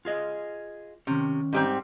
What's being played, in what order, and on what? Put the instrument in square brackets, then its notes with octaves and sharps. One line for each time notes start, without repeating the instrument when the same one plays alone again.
[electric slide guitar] F4 G#4 D#5
[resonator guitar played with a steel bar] C3 [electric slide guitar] D#3 C#4
[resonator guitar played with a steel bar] G#2 G3 C4